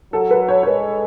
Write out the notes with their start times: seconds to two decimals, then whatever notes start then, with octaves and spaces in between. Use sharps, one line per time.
0.13 F#3 A4
0.31 B4
0.49 C#5
0.63 C#5
0.67 G#3 B4